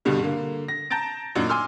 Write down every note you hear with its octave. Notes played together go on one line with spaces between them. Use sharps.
C2 G2 B2 D3 G3
D3 A#3
A#6
A5 A#5 G6 A6 D7
F#2 A#2 D4 D#4 F#4
G#5 C6 D6 E6 F6